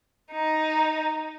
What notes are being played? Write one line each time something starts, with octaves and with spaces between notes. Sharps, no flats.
D#4